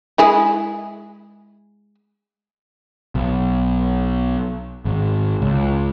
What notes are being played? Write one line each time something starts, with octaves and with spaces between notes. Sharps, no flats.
G#3 E4 G#4
B1
G#1
C#2